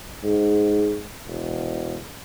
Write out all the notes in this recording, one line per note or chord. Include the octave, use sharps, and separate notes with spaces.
G#2
E1